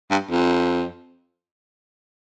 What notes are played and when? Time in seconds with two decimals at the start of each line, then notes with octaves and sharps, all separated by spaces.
0.11 G2
0.31 F2